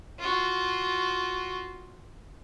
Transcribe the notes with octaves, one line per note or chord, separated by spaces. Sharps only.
F4 F#4